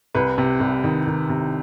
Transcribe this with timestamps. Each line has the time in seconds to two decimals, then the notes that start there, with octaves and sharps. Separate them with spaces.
0.14 C2 B4
0.38 C3
0.60 C2
0.84 D#3
1.07 D#3
1.29 C3